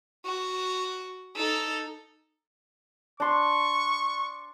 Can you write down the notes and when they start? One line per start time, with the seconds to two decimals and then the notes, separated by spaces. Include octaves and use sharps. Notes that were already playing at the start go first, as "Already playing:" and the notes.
0.25 F#4
1.36 D#4 A4
3.20 D4 C6 C#6